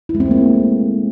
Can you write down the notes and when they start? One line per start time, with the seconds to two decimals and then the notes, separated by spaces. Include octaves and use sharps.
0.09 E4
0.15 G#3
0.20 C4
0.26 A3
0.31 A#3